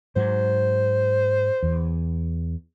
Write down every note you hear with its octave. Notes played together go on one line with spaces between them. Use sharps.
G#2 F#3 C5
E2